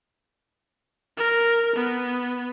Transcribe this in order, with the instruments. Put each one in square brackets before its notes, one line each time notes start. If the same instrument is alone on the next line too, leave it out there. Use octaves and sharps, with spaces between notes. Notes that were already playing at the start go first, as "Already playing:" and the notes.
[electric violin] A#4
B3